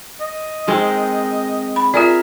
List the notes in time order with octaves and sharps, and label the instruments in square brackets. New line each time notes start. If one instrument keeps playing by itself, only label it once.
[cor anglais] D#5
[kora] D#3 G#3 C4
[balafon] B5
[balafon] F4 D5 [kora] G#4 A#4 E5